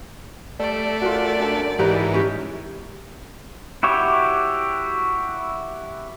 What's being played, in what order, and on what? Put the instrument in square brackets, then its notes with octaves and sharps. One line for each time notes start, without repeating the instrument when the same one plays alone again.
[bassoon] G3 [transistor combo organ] A3 [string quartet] D5
[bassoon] F#2 [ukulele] F4 F#4
[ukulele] D4 A5
[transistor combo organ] G#2 E3 [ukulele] G4 B4 A#5
[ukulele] C#4 G4
[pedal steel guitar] E4 F#4 G4 C#5